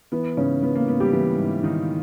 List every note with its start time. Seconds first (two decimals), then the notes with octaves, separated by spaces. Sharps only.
0.12 E3 B3
0.37 G#2 C#3 C#4
0.62 G#2 B3
0.75 A#3
0.88 G#2 B3
1.00 G3 G4
1.13 E3 E4
1.38 G#2
1.63 D#3 E3 D#4